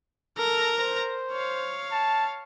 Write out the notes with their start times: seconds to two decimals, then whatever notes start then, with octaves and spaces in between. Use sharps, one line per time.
0.38 A4 A#4 A#5
0.79 C5
1.32 C#5 F5
1.92 A5